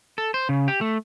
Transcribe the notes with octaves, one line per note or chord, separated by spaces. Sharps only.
A4
C5
C#3
G4
A3